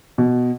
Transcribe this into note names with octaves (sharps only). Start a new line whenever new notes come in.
B2